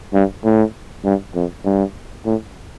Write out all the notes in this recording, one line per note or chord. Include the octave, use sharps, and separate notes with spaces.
G2
A2
G2
F2
G2
A2